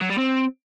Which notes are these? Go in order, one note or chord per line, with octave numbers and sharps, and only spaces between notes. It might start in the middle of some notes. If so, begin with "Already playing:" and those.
F#3
G3
C4